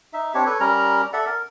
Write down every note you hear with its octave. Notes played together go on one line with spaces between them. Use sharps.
D#4 E5
C4 D4 G4 C#5
A4 B4 C#5
G3 C#4 A#4 A#5
A4 D5 E5 F#5
A#4